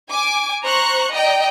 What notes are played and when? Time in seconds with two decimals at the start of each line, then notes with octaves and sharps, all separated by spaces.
0.11 G#5 D6
0.64 C5 A#5 C#6 F#6
1.11 D5 D#5 G5 A#5